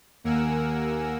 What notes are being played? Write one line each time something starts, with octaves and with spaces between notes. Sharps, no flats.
D#2 A#3 A#4 F#5 G#5 E6